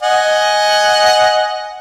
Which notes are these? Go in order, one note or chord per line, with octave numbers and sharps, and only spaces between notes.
D#5 F#5 G#5